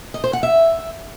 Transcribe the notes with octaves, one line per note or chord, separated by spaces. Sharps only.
D#5
C5
F#5
E5